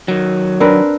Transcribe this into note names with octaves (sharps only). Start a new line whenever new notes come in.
D#3 F#3
C4 D4 A#4 B4